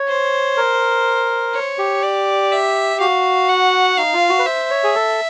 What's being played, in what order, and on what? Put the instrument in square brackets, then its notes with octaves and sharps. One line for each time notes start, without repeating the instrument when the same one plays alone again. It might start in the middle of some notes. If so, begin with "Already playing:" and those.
Already playing: [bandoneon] C#5
[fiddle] C5
[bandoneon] A#4
[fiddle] C#5
[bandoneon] G4
[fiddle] D5
E5
[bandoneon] F#4 [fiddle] F5
[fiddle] F#5
[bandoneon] D#4 [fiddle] F5
[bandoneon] F4
F#4
B4
[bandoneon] C5 [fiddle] E5
[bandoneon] C#5
G#4
A4